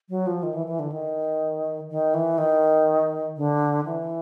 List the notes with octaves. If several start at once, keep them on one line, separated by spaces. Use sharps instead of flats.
F#3
F3
D#3
E3
E3
D3
D#3
D#3
E3
D#3
D3
E3